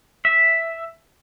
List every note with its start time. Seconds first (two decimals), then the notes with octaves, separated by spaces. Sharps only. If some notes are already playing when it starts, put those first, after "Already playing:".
0.25 E5